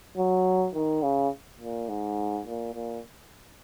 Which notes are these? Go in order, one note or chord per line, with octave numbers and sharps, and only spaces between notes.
F#3
D#3
C#3
A#2
G#2
A#2
A#2